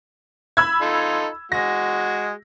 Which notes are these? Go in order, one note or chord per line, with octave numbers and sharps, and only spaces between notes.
B5 E6 G#6
D#4 F4 A4
G#3 F#4 A#6